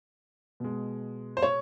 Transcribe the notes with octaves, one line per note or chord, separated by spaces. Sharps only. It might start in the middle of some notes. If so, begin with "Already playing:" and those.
B2 G#3
C5
C#5